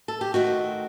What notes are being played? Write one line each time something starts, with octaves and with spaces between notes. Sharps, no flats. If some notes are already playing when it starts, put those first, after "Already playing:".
A4
G4
D#3 A3 C4 F#4